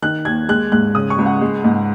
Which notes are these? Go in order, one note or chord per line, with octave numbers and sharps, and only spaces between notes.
D#3 F#6
D#2 G#6
G#3 F#6
G#2 F#6
C#3 D#6
C#6
C#2
F#5
G#3
G#2